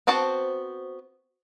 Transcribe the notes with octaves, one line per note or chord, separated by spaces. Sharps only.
B3 C4 F#4 C5 A5